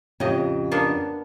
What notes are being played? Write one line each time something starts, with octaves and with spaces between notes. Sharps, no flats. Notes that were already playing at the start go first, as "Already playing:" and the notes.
F2 A2 C#3 G4 D#5
A#3 B3 D4